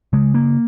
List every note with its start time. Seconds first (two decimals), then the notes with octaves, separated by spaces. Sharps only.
0.13 C#3 G#3
0.34 A#3